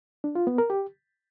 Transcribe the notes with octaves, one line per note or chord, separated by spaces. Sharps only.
D4
F4
B3
A#4
G4